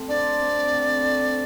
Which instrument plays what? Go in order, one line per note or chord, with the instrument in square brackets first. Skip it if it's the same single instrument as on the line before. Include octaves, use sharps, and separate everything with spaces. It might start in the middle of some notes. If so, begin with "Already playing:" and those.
Already playing: [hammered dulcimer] A3 C4 A4
[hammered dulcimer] D4 C5 [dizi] D5
[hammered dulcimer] C3
A3 C4
A3